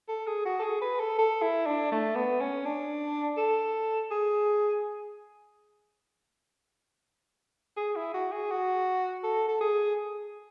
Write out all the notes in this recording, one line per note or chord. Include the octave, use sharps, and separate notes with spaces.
A4
G#4
F#4
A4
G#4
B4
A4
A4
E4
D4
A3
B3
C#4
D4
A4
G#4
G#4
E4
F#4
G#4
F#4
A4
A4
G#4